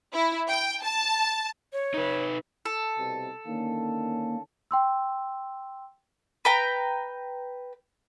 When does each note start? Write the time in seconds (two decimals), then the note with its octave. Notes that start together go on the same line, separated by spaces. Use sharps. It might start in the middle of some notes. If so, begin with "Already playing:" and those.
0.13 E4
0.48 G5
0.82 A5
1.73 C#5
1.94 D#4 B4
2.66 A4
2.98 C2 B2
3.46 D3 D#3 A#3 C#4
4.71 G5 C6 E6
6.45 B4 G5 A#5